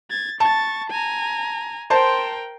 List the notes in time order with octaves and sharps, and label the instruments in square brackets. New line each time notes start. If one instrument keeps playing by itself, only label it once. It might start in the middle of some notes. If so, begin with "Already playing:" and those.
[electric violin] G#6 A6
[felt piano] A5 [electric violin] C#6 A6
[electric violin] G#5 A#5
[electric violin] A#4 G5 [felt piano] C5 A5 C6